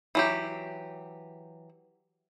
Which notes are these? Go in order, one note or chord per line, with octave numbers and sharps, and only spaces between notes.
E3 F#3 G4